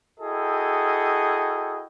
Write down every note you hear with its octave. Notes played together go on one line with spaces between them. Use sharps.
E4 F#4 G#4 A4 D#5 G5